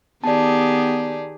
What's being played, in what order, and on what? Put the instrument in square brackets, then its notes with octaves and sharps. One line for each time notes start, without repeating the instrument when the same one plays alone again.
[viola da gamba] D#3 G4 G#4 [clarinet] B3 [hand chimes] D5 A5